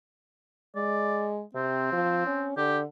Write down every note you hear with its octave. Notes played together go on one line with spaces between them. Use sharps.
G#3 D5
C3 C4
F3
C#4
D3 G4